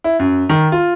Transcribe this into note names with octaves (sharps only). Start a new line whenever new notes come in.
E4
F#2
D#3
F4